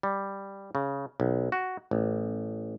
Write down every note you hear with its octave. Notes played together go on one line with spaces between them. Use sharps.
G3
C#3
B1
F#4
A1